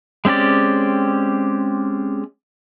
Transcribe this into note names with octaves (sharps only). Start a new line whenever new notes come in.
G#3 C4 C#4 G4 D5